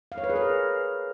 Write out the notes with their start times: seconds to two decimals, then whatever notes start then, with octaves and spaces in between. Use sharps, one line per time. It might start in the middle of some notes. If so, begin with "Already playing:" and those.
0.12 F5
0.18 C#5
0.24 B4
0.30 G#4
0.36 A#4